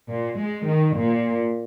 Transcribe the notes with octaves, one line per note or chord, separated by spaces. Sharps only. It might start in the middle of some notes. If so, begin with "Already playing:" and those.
A#2
G#3
D#3
A#2